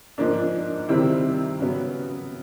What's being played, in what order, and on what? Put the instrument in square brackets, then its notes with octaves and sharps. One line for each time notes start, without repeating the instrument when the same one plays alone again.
[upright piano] G#2 F3 A#3 D4
C3 D#3 G3 C4 E4
C#3 F#3 B3